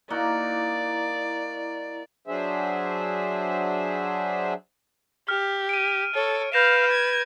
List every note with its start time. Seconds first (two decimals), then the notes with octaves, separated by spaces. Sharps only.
0.10 A#3 D#4 E4 F#4 D5 A#5
2.27 F#3 D4 G#4 C5 E5
5.29 G4 F6
5.69 D7 D#7
6.15 A4 C#5
6.53 B4 F5 G6 A#6 E7
6.91 G#6